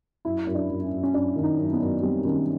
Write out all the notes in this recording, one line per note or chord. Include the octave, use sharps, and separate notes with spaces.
F#2 E4
F#2
D4
F#2
C#4
F#2
C#4
F#2 D4
D#3
D#4
F#2
B3
F#2
G3 C4
D#3 C#4